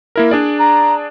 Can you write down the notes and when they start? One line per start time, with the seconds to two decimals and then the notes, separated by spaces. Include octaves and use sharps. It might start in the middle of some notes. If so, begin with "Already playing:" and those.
0.16 A#3 E4 A#4
0.31 D4 G#4 D5
0.59 A#5